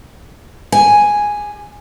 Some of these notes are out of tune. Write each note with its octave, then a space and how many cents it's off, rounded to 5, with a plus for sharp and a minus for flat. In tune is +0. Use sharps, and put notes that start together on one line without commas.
G4 +35 G#5 +0